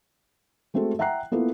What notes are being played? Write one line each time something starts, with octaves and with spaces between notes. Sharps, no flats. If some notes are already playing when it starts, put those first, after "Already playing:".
G#3 A3 C4 F#4 A4
E5 F#5 G5 A#5 F#6 C7
A#3 B3 E4 F4 A4 B4